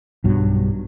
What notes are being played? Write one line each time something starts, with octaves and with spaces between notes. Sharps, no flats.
B1 G2 F#3